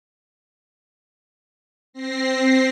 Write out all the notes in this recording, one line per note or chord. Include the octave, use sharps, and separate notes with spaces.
C4 A#6 C7